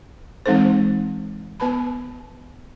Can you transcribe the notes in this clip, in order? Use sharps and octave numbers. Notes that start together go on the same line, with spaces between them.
E3 G#3 C4 D#4 A4 C5
B3 B4 A5 B5